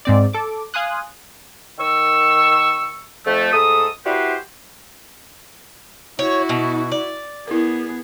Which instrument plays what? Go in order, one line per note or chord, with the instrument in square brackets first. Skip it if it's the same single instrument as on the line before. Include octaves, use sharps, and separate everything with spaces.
[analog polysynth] G#2 C4 D5
A4 D6
F5 G#5 C6 D#6 F#6
[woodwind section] D#3 C#6 E6
F2 A3
G#2 A3 A4 D#6
E4 F#4 G4 B4 C5
[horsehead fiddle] E4 F#4 [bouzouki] C#5
[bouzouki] B2
D5
[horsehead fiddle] B3 G#4 [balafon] E4 A#4